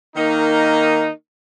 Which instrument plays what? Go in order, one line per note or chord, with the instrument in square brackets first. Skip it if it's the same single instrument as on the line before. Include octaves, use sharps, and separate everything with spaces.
[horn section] D#3 A#3 D#4